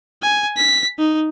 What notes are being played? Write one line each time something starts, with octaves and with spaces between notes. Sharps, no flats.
G#5
B6
D#4